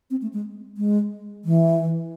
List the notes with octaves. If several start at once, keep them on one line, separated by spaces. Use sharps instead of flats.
C4
A3
G#3
G#3
E3